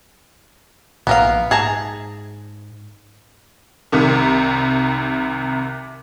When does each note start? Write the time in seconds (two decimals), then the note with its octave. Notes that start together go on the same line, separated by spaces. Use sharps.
1.07 A#1 G#2 B3 A#4 F5
1.51 G#2 G#4 A5 A#5
3.92 C2 C3 D#3